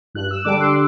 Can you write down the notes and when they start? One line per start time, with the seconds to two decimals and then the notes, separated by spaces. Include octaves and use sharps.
0.15 G2 F#6
0.31 E6
0.45 D3 G3 D4 D6
0.60 C6